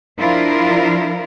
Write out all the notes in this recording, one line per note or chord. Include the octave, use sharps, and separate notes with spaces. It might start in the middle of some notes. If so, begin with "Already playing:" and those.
F3 D4 E4 F4 A#4